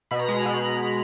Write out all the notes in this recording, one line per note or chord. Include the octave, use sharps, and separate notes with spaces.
B2 B5
A#5
G#3 B5
B2